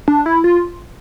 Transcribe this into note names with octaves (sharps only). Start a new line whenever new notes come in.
D4
E4
F4